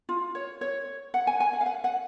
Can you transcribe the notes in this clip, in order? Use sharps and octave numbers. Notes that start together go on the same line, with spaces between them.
F4
C#5
C#5
F#5
G#5
G#5
F#5
F5
F#5
F#5